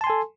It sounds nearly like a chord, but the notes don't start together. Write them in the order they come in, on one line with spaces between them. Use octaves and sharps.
A5 C6 G#5 A4